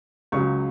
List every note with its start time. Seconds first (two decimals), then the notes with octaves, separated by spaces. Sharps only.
0.32 C#2 C#3 F#3 C#6